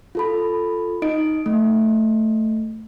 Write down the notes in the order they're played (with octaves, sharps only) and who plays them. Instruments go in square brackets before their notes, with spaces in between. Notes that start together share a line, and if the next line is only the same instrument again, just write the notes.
[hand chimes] F4 A4 B5
D#4 D#5 D7
A3